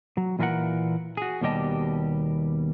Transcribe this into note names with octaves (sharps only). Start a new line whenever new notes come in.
F#3
A#2 E3 F4 G4 A#4 F#5
F#4 G#4
D#2 B2 G3 G4 D#5 A5